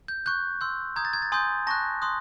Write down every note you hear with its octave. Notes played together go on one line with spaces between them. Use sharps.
G6
C#6 F#6 G6
C6 E6 G6
A#5 D#6 G6 G#6
A6
G#6
A6
G#5 C6 D#6 G6
A5 C#6 F#6 A#6
C6 D#6 F#6